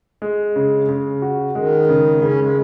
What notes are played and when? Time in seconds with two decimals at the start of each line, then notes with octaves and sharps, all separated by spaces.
0.22 G#3
0.56 C#3
0.89 C#3
1.22 F#4
1.55 D#3 G#3
1.89 C#3
2.22 C#3 C#4
2.39 G#3